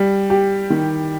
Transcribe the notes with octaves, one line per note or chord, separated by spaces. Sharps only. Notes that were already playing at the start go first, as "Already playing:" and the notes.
Already playing: G3
G4
D#3